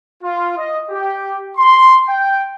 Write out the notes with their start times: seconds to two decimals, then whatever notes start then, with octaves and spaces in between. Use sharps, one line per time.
0.23 F4
0.57 D#5
0.90 G4
1.57 C6
2.08 G5